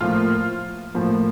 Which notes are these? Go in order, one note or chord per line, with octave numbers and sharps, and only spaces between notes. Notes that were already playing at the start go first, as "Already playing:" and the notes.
A2 F3 A#3 F4
A2 F3 A#3